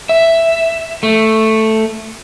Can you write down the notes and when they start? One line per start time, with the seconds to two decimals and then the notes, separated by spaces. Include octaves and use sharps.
0.09 E5
1.03 A3